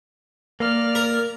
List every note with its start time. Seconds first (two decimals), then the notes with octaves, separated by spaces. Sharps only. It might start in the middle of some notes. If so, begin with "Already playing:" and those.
0.60 A#3 D5 F6
0.95 A#4